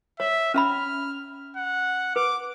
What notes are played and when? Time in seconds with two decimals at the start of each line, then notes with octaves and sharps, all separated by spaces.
0.20 C#5 E5
0.54 C#4 E5 B5 F6
1.57 F#5
2.16 B4 D6